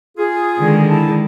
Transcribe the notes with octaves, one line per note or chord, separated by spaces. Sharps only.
F4 G#4
D3 D#3 G#3
E4 A5